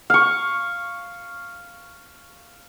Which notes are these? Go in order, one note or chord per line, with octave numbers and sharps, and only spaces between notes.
F5 C#6